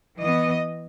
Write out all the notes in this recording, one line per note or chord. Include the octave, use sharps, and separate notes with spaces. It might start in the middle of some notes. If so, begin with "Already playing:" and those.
E3 B3 D#5